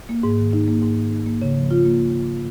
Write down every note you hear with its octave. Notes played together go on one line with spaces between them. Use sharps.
A#3
G#2
D#3
D#4
A#3
G#2
D#3
D#4
A#3
C#3
F3
F4
A#3